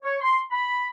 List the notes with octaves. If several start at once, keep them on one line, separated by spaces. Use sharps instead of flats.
C#5
C6
B5